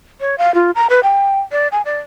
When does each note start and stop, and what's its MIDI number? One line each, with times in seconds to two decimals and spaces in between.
0.21 0.36 73
0.38 0.54 77
0.54 0.71 65
0.75 0.87 82
0.90 1.00 71
1.03 1.39 79
1.52 1.68 74
1.72 1.82 80
1.85 2.00 74